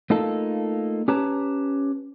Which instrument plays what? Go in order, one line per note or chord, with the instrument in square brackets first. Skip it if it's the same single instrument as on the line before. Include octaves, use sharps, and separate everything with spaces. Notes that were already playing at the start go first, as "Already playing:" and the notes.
[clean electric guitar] A3 A#3 D#4 F4 A4
C#4 G4 B4 C#5 A5 A#5